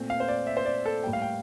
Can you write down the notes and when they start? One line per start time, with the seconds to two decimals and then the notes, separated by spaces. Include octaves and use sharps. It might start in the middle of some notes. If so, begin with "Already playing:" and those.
Already playing: A#2 A3 C4
0.10 F5
0.20 C5
0.28 D5
0.47 E5
0.57 C5
0.66 D5
0.86 A4
1.04 A2 G3 A#3 G5
1.13 F5
1.22 G5